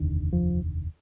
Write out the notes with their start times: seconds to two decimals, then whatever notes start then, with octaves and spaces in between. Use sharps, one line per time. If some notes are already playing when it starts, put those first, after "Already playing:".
Already playing: F1 D#2 D3
0.33 F3